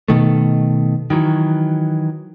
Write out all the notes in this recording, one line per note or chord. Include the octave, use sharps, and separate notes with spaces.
B2 D#3 A3
D#3 E3 F#3